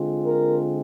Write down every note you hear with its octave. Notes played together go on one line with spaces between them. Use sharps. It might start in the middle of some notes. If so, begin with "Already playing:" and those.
Already playing: D3 G#3 C4 F4
A#4